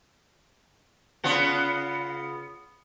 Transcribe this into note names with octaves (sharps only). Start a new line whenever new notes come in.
C#3 B3 F4